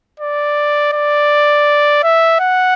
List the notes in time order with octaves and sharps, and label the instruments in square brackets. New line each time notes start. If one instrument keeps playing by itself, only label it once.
[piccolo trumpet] D5
D5
E5
F#5